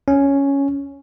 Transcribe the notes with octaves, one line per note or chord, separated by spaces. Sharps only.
C#4